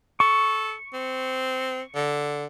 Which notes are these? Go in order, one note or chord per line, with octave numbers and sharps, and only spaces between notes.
A4 C#6
C4
D3